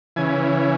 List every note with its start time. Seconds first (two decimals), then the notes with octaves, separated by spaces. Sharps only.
0.16 C#3 E3 G#5